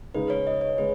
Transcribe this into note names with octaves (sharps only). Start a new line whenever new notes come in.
C#3 G#3 D#4 G#4 B4
C#5
D#5
C#5
C#3 G#3 B4